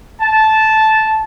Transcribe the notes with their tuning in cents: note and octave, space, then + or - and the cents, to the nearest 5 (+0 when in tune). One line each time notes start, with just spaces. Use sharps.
A5 -10